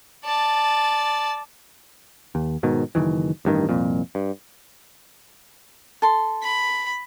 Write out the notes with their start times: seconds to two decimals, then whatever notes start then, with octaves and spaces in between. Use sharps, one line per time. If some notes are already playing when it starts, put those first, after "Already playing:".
0.25 D5 A5
2.35 D#2
2.63 G#2 B2 D#3
2.95 F#1 C3 D#3 E3
3.45 A1 G2 D#3
3.69 C2 F2 A#2
4.15 G2
6.02 A4 C6
6.43 B5